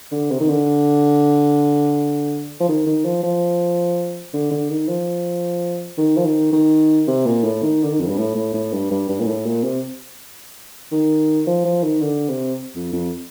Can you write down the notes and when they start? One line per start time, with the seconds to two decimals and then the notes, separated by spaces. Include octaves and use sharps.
0.12 D3
0.31 C3
0.40 D#3
0.49 D3
2.60 F3
2.69 D#3
2.86 D#3
3.05 F3
3.23 F3
4.33 D3
4.51 D3
4.69 D#3
4.88 F3
5.98 D#3
6.17 F3
6.26 D#3
6.53 D#3
7.08 C3
7.26 A#2
7.44 A2
7.62 D#3
7.83 D3
7.90 D#3
8.00 F2
8.08 G2
8.18 A2
8.36 A2
8.54 A2
8.72 G2
8.91 G2
9.09 G2
9.20 A#2
9.27 A2
9.46 A#2
9.64 C3
10.92 D#3
11.47 F3
11.65 F3
11.83 D#3
12.01 D3
12.29 C3
12.75 F2
12.93 F2